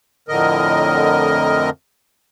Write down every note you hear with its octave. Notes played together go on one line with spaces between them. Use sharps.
F2 A2 D3 A#4 D#5